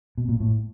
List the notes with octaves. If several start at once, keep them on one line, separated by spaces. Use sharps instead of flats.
B2
A#2
A2